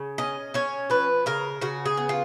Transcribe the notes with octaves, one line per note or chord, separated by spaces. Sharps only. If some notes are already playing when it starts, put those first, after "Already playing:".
Already playing: C#3
C#4 D#5
C#4 C#5
F3 B4
C#3 A#4
C#3 F#4
G#4
B3
F4